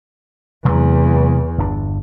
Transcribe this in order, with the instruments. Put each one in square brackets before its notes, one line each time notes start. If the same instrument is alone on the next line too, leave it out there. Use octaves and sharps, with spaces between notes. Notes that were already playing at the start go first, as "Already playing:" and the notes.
[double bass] E2 [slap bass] C3 F#3 G#3
[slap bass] G1 D4